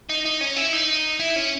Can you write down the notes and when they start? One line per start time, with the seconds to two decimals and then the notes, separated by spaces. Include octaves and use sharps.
0.09 D#4
0.25 D#4
0.41 C#4
0.56 E4
0.72 D#4
1.20 E4
1.36 C#4